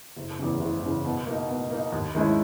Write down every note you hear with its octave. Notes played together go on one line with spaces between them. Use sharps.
F#1
E2 C#3
F#1
E2 C#3
B2
A#3 D#4
B2
A#3 D#4
D#2
D#3 G#3 C#4 E4